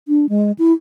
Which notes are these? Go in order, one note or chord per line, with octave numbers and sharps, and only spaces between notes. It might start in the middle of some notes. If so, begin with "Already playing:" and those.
D4
G#3
E4